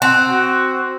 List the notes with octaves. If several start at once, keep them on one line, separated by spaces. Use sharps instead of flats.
C4 F#5
F#4